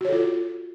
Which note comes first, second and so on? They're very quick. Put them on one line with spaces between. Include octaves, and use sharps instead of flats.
F#4 C#5 A4 F4